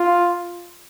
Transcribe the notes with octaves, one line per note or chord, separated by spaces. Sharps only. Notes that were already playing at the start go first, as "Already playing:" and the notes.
Already playing: F4